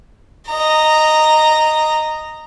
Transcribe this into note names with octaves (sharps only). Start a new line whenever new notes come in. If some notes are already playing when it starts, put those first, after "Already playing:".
D#5 A#5